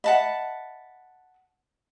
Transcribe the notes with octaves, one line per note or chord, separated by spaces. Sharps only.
D#5 E5 F#5 A5 B5